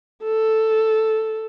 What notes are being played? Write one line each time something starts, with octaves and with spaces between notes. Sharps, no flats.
A4